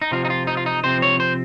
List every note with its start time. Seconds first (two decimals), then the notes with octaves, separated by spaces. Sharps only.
0.02 D#4
0.11 C3 F3 C4 F4
0.25 D#4
0.30 F4
0.47 D#4
0.57 F4
0.66 D#4
0.84 C3 F3 C4 C5
1.02 C#5
1.20 C5